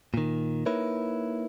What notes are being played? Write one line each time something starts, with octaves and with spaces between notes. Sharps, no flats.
A#2 D#3
A#3 D#4 E4 A#4 B4 C#5